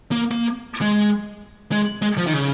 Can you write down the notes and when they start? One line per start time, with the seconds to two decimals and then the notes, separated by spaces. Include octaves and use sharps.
0.12 A#3
0.31 A#3
0.81 G#3
1.72 G#3
2.02 G#3
2.18 F3
2.27 D#3
2.33 C#3